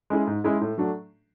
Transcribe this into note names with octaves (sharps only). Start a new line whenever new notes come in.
G#3 C#4 E4 G#4
G#2
G#3 C#4 E4 G#4
A2
F#3 A3 D4